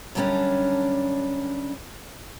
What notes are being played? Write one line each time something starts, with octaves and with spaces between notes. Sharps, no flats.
F#2 D3 G3 A3 C#4 D4